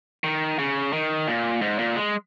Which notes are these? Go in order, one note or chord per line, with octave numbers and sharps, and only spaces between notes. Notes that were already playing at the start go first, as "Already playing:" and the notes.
D#3
C#3
D#3
A#2
G#2
A#2
G#3